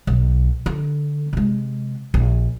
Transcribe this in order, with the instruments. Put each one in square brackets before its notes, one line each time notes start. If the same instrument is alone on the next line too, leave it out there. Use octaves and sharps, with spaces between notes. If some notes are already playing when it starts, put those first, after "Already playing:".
[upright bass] B1
D3
C3 G#3
A#1